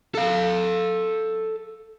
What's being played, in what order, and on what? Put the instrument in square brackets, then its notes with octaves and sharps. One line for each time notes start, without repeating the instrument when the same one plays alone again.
[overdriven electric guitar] A4 F5